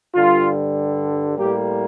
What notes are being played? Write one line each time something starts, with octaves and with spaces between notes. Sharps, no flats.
G2 D3 G3 F4
A2 G3 A#3 G4